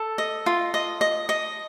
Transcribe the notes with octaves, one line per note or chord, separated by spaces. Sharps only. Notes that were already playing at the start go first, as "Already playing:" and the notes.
Already playing: A4
D#5
F4
D#5
D#5
D#5